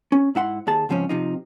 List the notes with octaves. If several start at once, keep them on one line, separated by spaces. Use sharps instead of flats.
C#4
G#2 E4 F#5 C6
D#2 D#3 G#4 A5
C#2 G#2 F3 C4 C#4
C3 F3 D#4